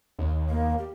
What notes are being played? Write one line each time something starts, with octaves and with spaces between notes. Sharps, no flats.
D#2
A#3
G4